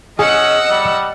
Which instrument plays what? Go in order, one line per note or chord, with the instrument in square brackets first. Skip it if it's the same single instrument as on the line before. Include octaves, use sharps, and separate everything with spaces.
[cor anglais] C#4 [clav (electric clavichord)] G#4 [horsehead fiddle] D#5 [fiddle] F#5 E6
[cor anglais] G3